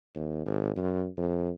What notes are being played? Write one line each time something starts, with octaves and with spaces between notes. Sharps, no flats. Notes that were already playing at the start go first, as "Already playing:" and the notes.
D#2
G#1
F#2
F2